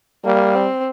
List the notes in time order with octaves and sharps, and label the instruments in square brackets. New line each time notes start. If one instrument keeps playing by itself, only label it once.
[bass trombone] G3 [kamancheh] A#3
[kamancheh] C4